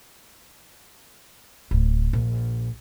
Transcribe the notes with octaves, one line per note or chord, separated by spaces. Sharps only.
D1
A#1